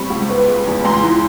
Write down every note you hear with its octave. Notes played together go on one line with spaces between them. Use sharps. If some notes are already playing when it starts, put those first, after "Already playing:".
Already playing: G3 C4 B5 C#6
C#2
B3
G#3
E2
C#2 A#5 C6
E3